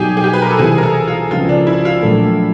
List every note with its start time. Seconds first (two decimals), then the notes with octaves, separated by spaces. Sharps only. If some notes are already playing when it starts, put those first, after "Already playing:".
Already playing: B1 B2 G3 G4 G#4
0.17 G#4
0.24 G4
0.33 B4
0.42 A#4
0.51 A4
0.59 C2 C3 E3 G#4
0.78 A#4
0.83 A4
1.07 F4
1.31 C#2 C#3 F3 F4
1.49 D4
1.67 E4
1.85 F4
2.02 A#1 A#2 F#3 A3